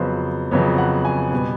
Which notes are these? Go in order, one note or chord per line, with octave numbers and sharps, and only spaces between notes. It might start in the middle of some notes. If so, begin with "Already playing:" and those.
Already playing: F2 C#3 F#3 B3 C5
F2 C#3 F#3 B3 C#5
F#5
G#5
B2 G3 B3